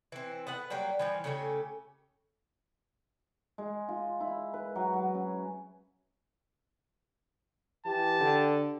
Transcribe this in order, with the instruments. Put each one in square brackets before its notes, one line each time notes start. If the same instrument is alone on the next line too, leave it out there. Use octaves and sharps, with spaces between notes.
[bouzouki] E3 C4
B3 B4 F#5
F#3 G3 A#3 G4
E3 F3 G3
C#3 A3 C#4 G4
[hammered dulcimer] G#3
F4
E4
B4
F#3
F#3
C#4
[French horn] E3 [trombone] G4 [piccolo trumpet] A5
[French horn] D3